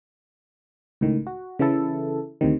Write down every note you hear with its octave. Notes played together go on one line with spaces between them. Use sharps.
C#2 A2 D#3
F#4
C#3 E3 E4 A4
D2 C3 D#3